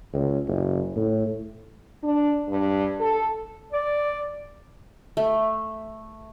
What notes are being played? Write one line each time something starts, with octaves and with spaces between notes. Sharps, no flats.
C#2
F#1
A2
D4
G2
A4
D5
A3